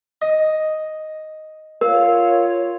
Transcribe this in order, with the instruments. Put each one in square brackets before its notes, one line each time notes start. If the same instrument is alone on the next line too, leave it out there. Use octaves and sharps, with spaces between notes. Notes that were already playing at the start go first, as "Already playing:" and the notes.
[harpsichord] D#5
[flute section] F4 C#5 [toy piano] A#4 [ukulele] F5